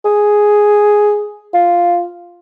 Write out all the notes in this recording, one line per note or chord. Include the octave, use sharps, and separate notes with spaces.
G#4
F4